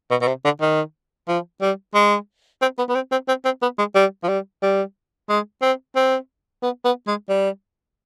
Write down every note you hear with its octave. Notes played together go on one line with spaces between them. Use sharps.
B2
B2
C3
D3
D#3
F3
G3
G#3
C4
B3
B3
C4
C4
C4
C4
B3
G#3
G3
F3
G3
G3
G#3
C4
C4
B3
B3
G#3
G3